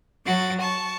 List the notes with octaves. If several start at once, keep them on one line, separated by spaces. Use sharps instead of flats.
F#3 F#4 A6
A5 C#6